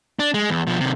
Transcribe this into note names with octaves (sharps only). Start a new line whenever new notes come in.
D4
G#3
E2
B2 F3
C3 D#3